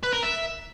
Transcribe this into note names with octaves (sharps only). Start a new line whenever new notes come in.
B4
A#4
E5